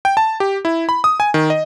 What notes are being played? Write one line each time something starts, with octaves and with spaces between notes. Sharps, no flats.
G5
A5
G4
E4
B5
D#6
G#5
D#3
D#5